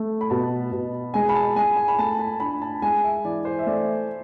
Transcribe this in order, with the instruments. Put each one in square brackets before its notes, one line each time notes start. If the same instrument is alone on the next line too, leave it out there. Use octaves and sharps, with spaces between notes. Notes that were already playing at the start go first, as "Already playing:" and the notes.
Already playing: [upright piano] A3
[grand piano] B5
[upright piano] B2 [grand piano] A5
[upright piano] B2
[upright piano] G#3 [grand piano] G#5
[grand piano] B5
A5
[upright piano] G#3 [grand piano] G#5
[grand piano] G#5
B5
[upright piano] A3 [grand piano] A5
[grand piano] A5
[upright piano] D4 [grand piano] B5
[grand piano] A5
[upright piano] G#3 [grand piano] G#5
[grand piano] E5
[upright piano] E3 [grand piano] D5
[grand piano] C5
E5
[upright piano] A3 [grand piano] D5